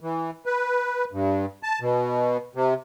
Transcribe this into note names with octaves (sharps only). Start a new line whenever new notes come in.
E3
B4
G2
A5
B2
C3